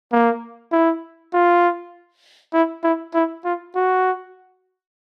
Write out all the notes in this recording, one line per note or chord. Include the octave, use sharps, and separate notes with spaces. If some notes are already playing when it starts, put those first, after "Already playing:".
A#3
E4
F4
E4
E4
E4
F4
F#4